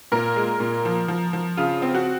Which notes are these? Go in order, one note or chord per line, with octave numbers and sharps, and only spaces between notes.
A#2 A#4
G#3
A#2
F3
F3
F3
C#3 F4
C4
F#4